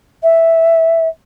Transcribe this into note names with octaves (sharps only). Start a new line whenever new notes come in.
E5